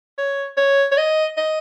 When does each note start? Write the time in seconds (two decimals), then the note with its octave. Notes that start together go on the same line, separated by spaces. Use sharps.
0.18 C#5
0.57 C#5
0.92 C#5
0.97 D#5
1.37 D#5